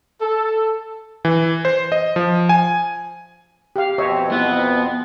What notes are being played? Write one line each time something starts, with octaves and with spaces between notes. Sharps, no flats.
A4
E3
C5
D#5
F3
G#5
G4 F5
F2 B2 C4 C#5 D#5 E5
B3 E4